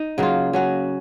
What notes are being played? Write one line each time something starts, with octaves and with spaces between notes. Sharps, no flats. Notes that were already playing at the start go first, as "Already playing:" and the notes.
Already playing: D#4
C#3 F#3 A#3 F4
F#3 C#4 F#4